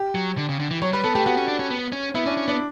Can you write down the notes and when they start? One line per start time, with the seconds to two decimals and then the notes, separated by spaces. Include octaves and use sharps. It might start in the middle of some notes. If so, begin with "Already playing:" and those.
Already playing: G4
0.15 F#3
0.37 D3
0.49 C#3
0.60 D3
0.71 E3
0.82 F#3 C#5
0.93 G3 B4
1.04 B3 A4
1.15 A3 G4
1.26 B3 F#4
1.37 C#4
1.48 D4
1.59 C#4
1.70 B3
1.92 C#4
2.15 B3 E4
2.26 C#4 D4
2.37 C#4
2.48 B3 D4